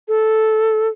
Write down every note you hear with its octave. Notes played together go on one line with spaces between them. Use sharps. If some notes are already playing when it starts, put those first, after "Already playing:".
A4